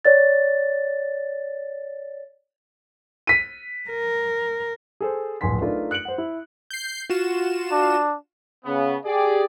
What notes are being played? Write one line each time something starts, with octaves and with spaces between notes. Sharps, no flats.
C#5 D5 A6
B6 D#7
A#4
G#4 A4 C5
D1 A#1 G#5 C6 B6
A3 D4 D#4 F4 A#4 B4
F#6 C#7 D7 F#7
C5 F#5
E4
G6 C7
F4 F#4 E7
D4
C#3 B3
G4 G#4 D5